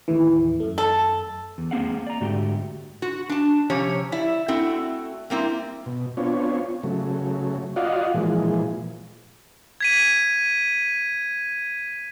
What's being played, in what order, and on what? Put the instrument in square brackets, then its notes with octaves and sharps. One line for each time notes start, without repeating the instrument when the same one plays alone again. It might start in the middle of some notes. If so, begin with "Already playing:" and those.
[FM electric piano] D#2 A2 E3
F#2 A3
[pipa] A4
[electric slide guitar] E2
A#3 C4 G#4 F5 F#5
D5 A#5
G#2 D3 A3 F#4 G4
[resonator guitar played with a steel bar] F#4
D4 A5
C3 F3 C#4 G4 C#5
E4 D5 E5
A3 C4 E4 F#4
G3 A#3 C4 E4
[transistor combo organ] B2
B3 C4 D4 F4 C#5
C#3 F#3 A3
F4 F#4 D5 D#5 F5 F#5
A#2 E3 F3 G#3
[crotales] G#6 B6 D#7